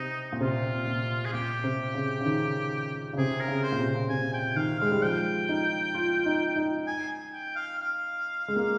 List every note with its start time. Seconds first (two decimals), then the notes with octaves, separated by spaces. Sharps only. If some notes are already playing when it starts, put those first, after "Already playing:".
Already playing: C3 D#4
0.32 A#2
0.41 C3 F4
0.87 A#2
1.25 G#4
1.33 A#2 G4
1.64 C3
1.94 C#3
2.21 C#3
2.25 D#3
3.13 C#3
3.17 C3 G#4
3.41 A#4
3.48 C#3
3.64 C5
3.72 A#2
3.79 C3
4.09 C3 G#5
4.34 G5
4.56 D#3 F5
4.79 G#3 F5
4.91 G3
5.02 F3 G5
5.49 D#4
5.95 F4
6.14 F4
6.26 D#4
6.56 D#4
6.87 G#5
7.33 G5
7.56 F5
7.79 F5
8.48 G#3
8.56 A#3